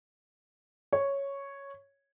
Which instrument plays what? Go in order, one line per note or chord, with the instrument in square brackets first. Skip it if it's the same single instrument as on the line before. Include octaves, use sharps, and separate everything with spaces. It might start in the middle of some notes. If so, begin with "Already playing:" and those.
[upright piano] C#5